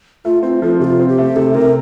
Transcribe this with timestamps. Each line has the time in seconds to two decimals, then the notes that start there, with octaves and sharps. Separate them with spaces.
0.25 A3 F4
0.43 C4 F4
0.62 F3 A4
0.80 C3 G4
0.84 F4
0.99 C4
1.09 G4
1.18 A3
1.36 C3 A4
1.55 C3 A#4